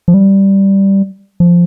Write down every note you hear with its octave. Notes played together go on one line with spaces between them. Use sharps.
F3
G3
F3